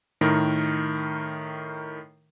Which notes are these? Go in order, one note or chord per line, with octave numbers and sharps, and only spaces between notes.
A2 D#3 A#4